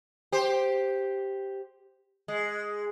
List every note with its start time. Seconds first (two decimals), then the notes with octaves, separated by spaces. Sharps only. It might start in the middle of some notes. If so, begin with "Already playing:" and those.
0.32 G4 C5
2.28 G#3